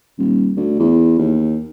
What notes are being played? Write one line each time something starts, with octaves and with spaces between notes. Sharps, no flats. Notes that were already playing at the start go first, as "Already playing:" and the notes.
D#1
D2
E2
D#2